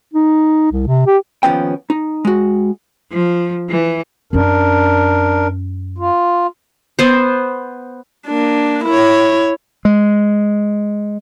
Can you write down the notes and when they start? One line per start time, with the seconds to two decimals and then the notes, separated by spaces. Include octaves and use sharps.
0.14 D#4
0.72 C2
0.87 C3
1.07 G4
1.43 D#2 F3 B3 C#4 G5
1.90 D#4
2.25 G#3 F#4
3.12 F3
3.69 E3
4.33 F#2 C#4 D4 A#4
5.98 F4
6.99 B3 C5
8.27 A#3 D4
8.85 E4 C#5
9.85 G#3